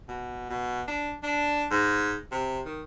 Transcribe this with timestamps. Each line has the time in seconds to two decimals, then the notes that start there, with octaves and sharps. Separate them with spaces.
0.09 B2
0.50 B2
0.88 D4
1.23 D4
1.71 G#2
2.32 C3
2.66 D#3